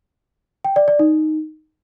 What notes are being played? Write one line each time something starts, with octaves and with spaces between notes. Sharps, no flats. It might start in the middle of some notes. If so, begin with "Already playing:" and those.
G5
D5
D5
D#4